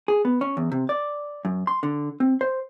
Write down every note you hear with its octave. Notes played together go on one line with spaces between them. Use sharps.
G#4
B3
C#4
E2
C3
D5
F#2
C6
D3
C4
C5